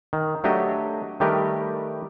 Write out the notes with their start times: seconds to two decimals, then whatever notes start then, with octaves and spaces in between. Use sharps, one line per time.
0.13 D#3
0.44 F#3 A3 D4 G4 D#5
1.20 D#3 G3 A3 G4 A#4 B4